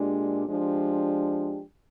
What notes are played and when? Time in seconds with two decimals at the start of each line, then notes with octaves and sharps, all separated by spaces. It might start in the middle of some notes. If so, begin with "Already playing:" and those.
Already playing: A#2 G#3 D4 G4
0.46 F3 G#3 D4 G4